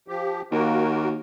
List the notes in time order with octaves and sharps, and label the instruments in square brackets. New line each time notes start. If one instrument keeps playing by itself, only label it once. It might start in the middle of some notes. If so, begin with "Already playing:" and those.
[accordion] F3 G4
[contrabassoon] D#2 [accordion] A#3 F#4 A#4